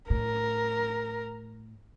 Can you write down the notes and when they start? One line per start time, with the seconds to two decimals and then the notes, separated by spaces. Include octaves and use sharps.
0.10 A2 A#4